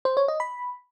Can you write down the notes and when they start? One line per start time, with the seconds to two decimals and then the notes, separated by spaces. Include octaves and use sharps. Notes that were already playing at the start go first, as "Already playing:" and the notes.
0.05 C5
0.17 C#5
0.28 D#5
0.40 B5